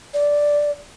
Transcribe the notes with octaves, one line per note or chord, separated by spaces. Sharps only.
D5